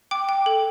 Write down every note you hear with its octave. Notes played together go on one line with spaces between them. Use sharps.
G5 D6
G5
A4